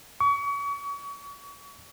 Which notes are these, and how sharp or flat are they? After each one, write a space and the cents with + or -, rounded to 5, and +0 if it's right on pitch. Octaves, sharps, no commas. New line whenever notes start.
C#6 +35